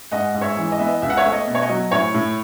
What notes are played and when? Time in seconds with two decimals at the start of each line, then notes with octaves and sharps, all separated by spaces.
0.11 G#2 D#5 F#5
0.34 G#2
0.41 C#5 E5
0.57 E3
0.72 D#5
0.79 B3 E5
0.86 D#5
1.02 C#2 E5
1.10 F#5
1.17 C#5 E5
1.25 A3
1.33 D#5
1.47 B2
1.55 C#5
1.62 D#5
1.69 F#3
1.91 A2 C#5
2.14 A2